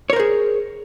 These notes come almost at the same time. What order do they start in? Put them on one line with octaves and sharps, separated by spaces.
C#5 A#4 C5 G#4